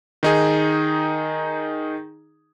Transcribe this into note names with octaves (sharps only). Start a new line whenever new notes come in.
D#3 D#4 G#4